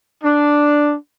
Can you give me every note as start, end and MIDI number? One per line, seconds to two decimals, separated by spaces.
0.23 0.93 62